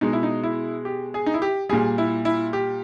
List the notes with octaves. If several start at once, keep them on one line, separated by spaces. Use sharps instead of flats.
B2 G#3 D#4
E4
D#4
E4
G4
G#4
D#4
E4
G4
A#2 G3 G#4
E4
E4
G4